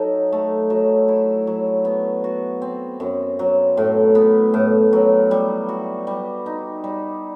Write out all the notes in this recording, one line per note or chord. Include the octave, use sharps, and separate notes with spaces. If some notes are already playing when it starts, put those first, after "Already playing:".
Already playing: F#3 D#4 A4
A3
F#3
E4
F#3
B3
F#4
C4
F#2
F#3
A2
B3
A2
F#3
G3
F#4
G3
D#4
G3